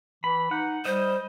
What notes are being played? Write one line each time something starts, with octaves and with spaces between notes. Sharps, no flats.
E3 B5
D#4 F#5
G3 C5 D#5